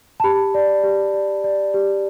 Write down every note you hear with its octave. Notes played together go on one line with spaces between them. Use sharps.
A5
G4 B5
D5
G4
D5
D5
G4